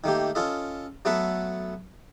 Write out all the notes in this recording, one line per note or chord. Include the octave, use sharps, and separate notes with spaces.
D#3 A3 A#3 G4
C#4 F4 A4 D#5
F#3 A3 B3 F#4 A4 E5